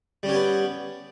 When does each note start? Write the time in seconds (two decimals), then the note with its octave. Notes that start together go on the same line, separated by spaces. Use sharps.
0.23 G3
0.26 C#4
0.29 G4
0.32 C#5
0.34 B3